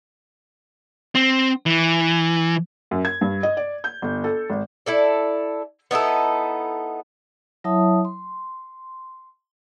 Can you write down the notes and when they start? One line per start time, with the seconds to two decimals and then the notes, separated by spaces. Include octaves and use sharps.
1.15 C4
1.66 E3
2.91 F#2
3.05 G#6
3.21 G2
3.43 D#5
3.57 D5
3.84 G6
4.02 G1
4.24 A4
4.50 G#1
4.86 E4 A4 D5
5.91 B3 D#4 E4 A4
7.64 F#3 E4 C#5 E5 A5 D#6
8.05 C6